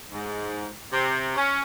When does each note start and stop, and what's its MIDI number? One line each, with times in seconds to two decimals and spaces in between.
0.12 0.67 44
0.91 1.32 48
1.36 1.62 61